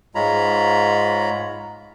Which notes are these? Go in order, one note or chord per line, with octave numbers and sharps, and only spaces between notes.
G#2 G#3 F4 C#5 A#5 B5